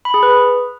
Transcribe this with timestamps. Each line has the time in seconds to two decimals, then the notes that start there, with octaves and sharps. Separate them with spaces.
0.05 B5
0.14 G#4
0.23 B4